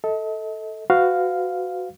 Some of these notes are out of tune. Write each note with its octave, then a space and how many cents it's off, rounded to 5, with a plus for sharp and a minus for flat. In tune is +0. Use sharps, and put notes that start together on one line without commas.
A4 +0 D#5 +40
F#4 +0 B4 +35 F5 +0